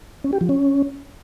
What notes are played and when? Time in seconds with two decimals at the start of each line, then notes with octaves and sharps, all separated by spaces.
0.24 C#4
0.33 G4
0.41 F3
0.49 C#4